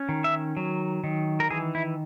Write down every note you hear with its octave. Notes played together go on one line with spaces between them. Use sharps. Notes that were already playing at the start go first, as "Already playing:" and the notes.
Already playing: C#4
D#3
E5
F#3
D#3
A#4
E3 G#4
E4